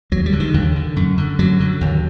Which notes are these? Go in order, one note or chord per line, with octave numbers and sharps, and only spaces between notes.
D#2 F#3
G3
D3
D#3
D#2 D3
D3
F#2
D3
F#2 F#3
D3
D#2